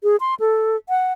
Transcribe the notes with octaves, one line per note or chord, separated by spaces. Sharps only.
G#4
C6
A4
F#5